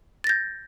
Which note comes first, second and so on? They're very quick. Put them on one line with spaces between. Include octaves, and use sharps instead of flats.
A6 A#6 G6